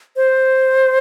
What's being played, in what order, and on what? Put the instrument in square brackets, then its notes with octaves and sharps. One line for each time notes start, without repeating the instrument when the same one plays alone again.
[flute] C5